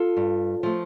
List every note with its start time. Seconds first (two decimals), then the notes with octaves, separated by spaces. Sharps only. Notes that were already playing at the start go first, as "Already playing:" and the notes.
Already playing: F4 A4
0.17 G2
0.63 F3 A3